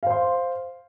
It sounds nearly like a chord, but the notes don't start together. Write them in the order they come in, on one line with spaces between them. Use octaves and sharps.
F5 C5 C6